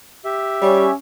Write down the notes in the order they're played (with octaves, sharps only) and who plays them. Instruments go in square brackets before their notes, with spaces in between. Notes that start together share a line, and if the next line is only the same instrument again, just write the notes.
[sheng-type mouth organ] G4 E5
[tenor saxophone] G3 [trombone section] C#4